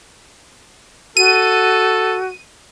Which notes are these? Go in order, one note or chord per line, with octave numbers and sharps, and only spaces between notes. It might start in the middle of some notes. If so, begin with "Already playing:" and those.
F#4 A4 D#7